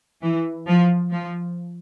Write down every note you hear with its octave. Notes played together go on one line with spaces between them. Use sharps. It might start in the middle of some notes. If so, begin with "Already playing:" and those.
E3
F3
F3